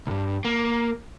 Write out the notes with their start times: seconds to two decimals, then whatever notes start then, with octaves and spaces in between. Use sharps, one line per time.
0.07 C2 G2
0.45 A#3